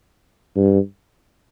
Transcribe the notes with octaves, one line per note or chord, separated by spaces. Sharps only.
G2